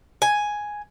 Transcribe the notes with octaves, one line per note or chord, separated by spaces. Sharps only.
G#5